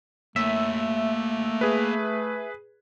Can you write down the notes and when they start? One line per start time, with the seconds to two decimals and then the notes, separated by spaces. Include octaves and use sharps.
0.36 A3 A#3 C#5 E5
1.61 G#4 B4